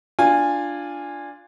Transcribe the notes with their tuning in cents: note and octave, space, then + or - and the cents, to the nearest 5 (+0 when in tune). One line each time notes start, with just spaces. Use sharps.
D4 +0 F4 +0 G#5 -15